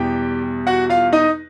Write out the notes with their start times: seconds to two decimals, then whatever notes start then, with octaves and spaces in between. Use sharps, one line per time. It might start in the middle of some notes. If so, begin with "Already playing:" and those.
Already playing: E2 B2 G3 G4 G5
0.67 F#4 F#5
0.90 F4 F5
1.13 D#4 D#5